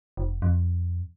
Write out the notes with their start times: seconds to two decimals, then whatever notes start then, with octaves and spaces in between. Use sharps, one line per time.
0.17 F1
0.42 F2